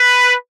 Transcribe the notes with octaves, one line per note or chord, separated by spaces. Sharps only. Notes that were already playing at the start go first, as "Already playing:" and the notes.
Already playing: B4